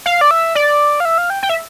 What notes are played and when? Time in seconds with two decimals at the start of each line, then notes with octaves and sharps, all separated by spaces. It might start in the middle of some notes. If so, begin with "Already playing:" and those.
0.06 F5
0.21 D5
0.31 E5
0.55 D5
1.00 F5
1.05 E5
1.18 F5
1.30 G5
1.43 G5
1.49 E5